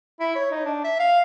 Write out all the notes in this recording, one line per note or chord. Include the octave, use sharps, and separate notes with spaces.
E4
C#5
D#4
D4
E5
F5